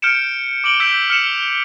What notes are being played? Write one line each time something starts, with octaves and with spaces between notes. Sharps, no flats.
F6 G6 C#7 D7 E7
D6 D7 F#7 G7
E6 G6 B6 D7
F6 C#7 E7 F7